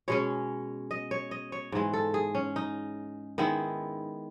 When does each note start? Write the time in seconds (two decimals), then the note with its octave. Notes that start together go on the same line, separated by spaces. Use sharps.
0.08 B2 G#3 C#4 C#5
0.91 D#5
1.11 C#5
1.31 D#5
1.52 C#5
1.72 G#2 E3 G#3
1.93 A4
2.14 G#4
2.35 C#4
2.56 D#4
3.38 D#3 G#3 B3 E4